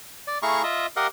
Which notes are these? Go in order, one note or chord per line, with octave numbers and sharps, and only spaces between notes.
D5
A3 E4 G#4 F5 A#5 C#6
F4 D#5 E5
G4 A#4 D#5 F5 F#5